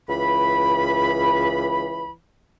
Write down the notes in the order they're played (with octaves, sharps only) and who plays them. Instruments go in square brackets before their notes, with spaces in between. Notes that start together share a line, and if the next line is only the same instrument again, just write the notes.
[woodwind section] C#2 E3 B5